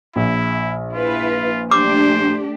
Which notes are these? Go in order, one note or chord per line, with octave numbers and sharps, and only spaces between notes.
A#1 E4
E4 F4 B4
A3 D4 G4 C5 D6